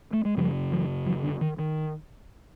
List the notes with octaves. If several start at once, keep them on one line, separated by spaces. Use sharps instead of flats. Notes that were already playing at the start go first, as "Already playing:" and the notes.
A3
G#3
F#2 C#3 F3 G3
E3 F#3
E3 F#3
D3
D#3
D#3